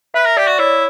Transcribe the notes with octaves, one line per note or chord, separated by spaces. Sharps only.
B4 E5
A#4
G4 D5
F#4
E4 C#5